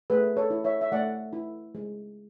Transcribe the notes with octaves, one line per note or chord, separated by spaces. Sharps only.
A3 G#4 B4
A4 C#5
E4
C#5 E5
E5
A3 D5 F#5
E4
G#3